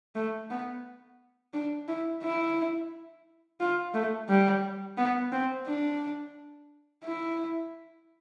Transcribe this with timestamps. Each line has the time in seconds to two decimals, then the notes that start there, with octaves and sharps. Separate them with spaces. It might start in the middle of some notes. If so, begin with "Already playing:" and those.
0.15 A3
0.51 B3
1.53 D4
1.88 E4
2.23 E4
3.60 F4
3.94 A3
4.29 G3
4.97 B3
5.32 C4
5.67 D4
7.04 E4